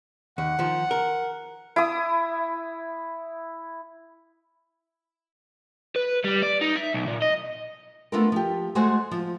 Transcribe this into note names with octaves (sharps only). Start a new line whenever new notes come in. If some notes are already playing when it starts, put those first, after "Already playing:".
D#2 F#5
D#3 F3
A#4
E4 D#6
B4
G3
D5
D#4
E5
B1
A#2
D#5
A3 B3 D4 F4 A4 A#4
F3 G4
G#3 A3 F#4 G#4 A4 C5
F3